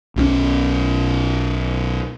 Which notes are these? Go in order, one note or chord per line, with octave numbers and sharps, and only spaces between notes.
B1 B2 D#3 C#4